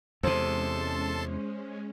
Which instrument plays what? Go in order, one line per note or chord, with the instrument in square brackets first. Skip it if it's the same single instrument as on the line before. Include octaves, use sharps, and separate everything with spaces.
[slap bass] E2 C3 [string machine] G#3 C#4 [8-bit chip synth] A4 A5 C6 [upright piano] C5